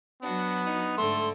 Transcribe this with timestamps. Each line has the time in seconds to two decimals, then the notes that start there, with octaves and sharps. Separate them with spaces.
0.22 F#3 B3 D4 F#4
0.66 D#4
0.97 G#2 D3 A3 C6